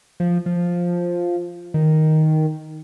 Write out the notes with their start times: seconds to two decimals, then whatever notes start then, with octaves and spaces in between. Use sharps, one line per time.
0.20 F3
0.46 F3
1.74 D#3